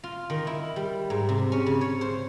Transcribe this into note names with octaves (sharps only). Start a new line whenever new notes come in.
F4
D#3
E4
G3
G#2
C3
C#4
C#3
C#5
C5